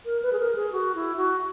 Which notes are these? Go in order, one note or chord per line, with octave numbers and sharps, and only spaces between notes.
A#4
B4
G#4
A#4
G#4
F#4
E4
F#4